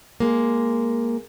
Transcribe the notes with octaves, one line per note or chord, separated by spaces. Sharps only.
G#3 A#3